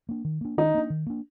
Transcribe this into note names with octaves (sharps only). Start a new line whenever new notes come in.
A#3 D4
D#3
A#3 D4
D#3 D#4
A#3 D4
D#3
A#3 D4